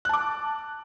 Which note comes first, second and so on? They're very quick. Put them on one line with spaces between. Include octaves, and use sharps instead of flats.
F#6 A5 D6